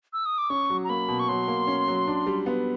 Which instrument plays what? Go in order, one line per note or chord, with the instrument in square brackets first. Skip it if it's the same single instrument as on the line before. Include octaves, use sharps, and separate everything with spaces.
[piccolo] E6
D#6
D6
[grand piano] C#4 [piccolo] C#6
[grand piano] F#3
[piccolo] A#5
[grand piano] A#3 [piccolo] B5
[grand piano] B2
[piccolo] C#6
[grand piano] F#3 [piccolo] C6
[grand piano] A#3
C#4
F#3
D4
G3
B3